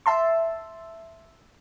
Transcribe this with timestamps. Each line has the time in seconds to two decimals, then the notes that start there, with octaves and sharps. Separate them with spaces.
0.06 E5 A5 C6